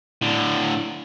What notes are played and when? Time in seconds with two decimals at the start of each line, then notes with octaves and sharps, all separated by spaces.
0.21 A2 D3